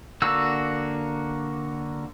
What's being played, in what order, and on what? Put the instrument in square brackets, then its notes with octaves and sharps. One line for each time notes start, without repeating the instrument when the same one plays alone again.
[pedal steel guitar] D3 A#3 F#4 E6